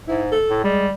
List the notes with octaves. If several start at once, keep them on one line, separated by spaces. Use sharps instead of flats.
G#2 E4
A4
A2
G3 G#3